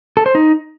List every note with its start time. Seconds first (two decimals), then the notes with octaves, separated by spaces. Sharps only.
0.17 A4
0.26 C5
0.35 D#4